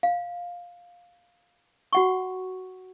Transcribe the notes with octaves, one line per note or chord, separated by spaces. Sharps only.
F5
F#4 F#5 C#6